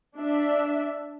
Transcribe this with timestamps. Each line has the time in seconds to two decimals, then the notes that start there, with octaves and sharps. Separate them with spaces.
0.17 D4 E5